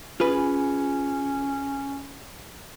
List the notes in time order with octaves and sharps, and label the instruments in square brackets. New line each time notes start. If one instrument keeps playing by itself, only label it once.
[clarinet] C#4 [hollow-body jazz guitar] F4 G#4 B4